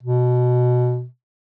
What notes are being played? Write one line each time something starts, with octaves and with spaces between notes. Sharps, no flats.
B2